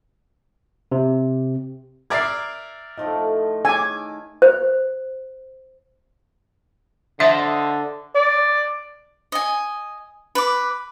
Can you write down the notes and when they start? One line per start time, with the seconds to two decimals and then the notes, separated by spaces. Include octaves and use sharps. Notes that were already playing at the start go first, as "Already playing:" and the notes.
0.92 C3
2.10 A#4 D5 E5 G#6 A6 C7
2.98 A2 F3 A3 D#4
3.65 D#3 G#5 D6 E6
4.42 C5
7.20 D3 C5 D#5 E5 A5
8.15 D5
9.32 D#5 G#5
10.35 B4 D6